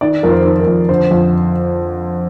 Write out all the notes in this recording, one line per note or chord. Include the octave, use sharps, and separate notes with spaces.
D#3 D5
F2 A#4
C5
D#3
A#4
F2
D3 C5
F2